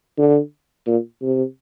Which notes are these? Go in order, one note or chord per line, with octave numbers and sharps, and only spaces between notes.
D3
A#2
C3